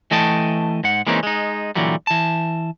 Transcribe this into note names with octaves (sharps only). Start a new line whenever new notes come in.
E3 A3 D#5 G5 A5
G#2 F#5
E3 G#3 A#3 C4 C#4 D#4
G#3 D#4
A#2 D3 E3 F#3 G3
E3 A5